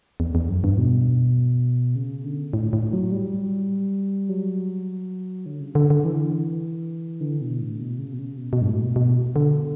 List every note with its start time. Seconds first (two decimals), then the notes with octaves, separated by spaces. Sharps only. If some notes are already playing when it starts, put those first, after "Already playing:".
0.20 E2
0.35 E2
0.49 F#2
0.64 G2
0.78 B2
1.96 C#3
2.24 D3
2.53 A2
2.73 A2
2.93 F#3
3.12 G3
4.29 F#3
5.46 D3
5.60 C#3
5.75 D3
5.90 D3
6.05 E3
7.21 D3
7.41 B2
7.60 A2
7.79 B2
7.99 C#3
8.13 B2
8.19 C#3
8.38 B2
8.53 B2
8.62 G2
8.67 A2
8.82 B2
8.96 B2
9.36 D3